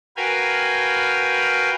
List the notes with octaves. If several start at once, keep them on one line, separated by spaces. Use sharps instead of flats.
F#4 A#4 B4 F5 G5 G#5